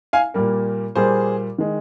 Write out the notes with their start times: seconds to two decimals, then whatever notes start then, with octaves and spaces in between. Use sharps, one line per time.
0.13 F5 G#5
0.34 A#2 G3 A#3
0.96 A#2 G3 A#3 G#4 C5
1.58 D#3 G#3